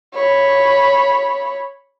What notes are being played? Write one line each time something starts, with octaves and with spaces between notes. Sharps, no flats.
C#5 B5